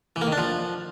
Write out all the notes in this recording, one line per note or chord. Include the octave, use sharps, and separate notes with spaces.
E3
A#3
D#3
D4
F3